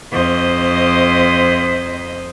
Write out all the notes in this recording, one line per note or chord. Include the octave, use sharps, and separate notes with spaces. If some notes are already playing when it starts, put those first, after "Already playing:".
F2 C5 D#5